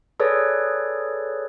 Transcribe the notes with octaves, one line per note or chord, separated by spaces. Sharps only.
G#4 A4 B4 C#5 D5